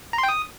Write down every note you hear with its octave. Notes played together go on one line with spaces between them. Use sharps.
A#5
C6
G5
D#6